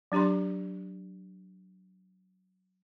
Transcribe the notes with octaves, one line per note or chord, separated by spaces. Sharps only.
F#3 D4 G4 A#5 C6